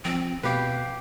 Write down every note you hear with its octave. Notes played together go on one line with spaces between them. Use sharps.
F3 C4
B2 G4 B4 F5